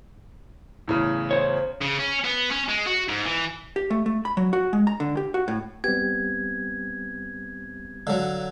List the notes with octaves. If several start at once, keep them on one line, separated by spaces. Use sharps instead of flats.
E2 A2 C#3
C5 C#5
C#3
C#4
B3
C#4
G#3
F#4
G#2
E3
G4
A3
A3
B5
F#3
F#4
G#3
A#5
D3
G4
F#4
A2
G3 B3 C4 G4 G#6
D3 F#3 F5